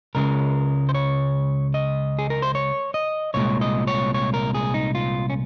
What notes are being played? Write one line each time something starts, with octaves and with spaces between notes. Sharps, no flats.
C#2 C#3 G#3 A#4
C5
C#5
D#5
G#4
A#4
C5
C#5
D#5
C2 A#2 G#3 C#5
D#5
C#5
C#5
A#4
G#4
D#4
F4
C#4